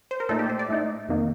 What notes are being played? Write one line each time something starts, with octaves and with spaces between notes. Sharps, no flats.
C5
A#4
A#2 A3 D#4 A4
G4
C5
D5
A2 A3 D#4
F2 C3 D#3 A#3 D#4